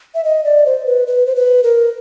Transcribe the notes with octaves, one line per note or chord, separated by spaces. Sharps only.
E5
D#5
D5
C5
B4
B4
C5
B4
A#4